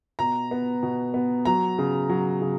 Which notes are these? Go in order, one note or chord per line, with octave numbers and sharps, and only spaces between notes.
B2 A#5
B3
B2
B3
F#3 A#5
C#3
F#3
C#3